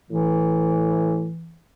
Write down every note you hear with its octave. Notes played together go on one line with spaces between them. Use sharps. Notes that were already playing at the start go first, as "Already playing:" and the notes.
A2 E3